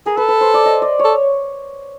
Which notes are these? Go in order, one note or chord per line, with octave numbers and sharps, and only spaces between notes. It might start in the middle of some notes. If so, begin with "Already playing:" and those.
G#4 A#4
A4 B4
B4
C5
D5
D#5
D5
C#5
A4